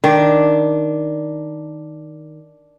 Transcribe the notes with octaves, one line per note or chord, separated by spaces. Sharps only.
D#3 D4